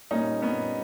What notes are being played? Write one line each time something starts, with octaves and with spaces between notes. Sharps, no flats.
A#2 G3 A#3 C#4 D#4
A#2 G3 A#3 B3 C#4